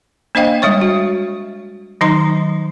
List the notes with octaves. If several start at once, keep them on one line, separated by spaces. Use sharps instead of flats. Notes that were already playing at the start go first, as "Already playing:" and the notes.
A#3 D4 C5 D#5 F5 G5
G3 G#3 C#5 C#6
F#4
D#3 F#3 D#4 A#5 C6